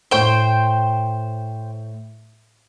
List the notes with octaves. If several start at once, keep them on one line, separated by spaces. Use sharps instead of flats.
A2 C5 G5 C#6 G7